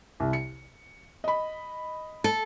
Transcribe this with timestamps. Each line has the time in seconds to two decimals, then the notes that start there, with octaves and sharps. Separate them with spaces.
0.20 C2
0.33 C#7
1.24 D#5 B5
2.24 A4